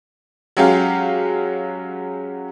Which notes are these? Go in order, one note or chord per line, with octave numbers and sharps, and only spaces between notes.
F#3 G#3 C#4 G4 F5